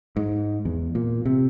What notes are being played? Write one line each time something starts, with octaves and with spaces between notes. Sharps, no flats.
G#2
E2
A#2
C3